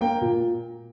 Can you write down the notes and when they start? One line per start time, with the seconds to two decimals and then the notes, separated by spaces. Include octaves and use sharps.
0.01 A#3 G5
0.21 A#2